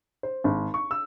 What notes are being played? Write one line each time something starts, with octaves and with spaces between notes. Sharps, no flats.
C5
G#1
C#6
E6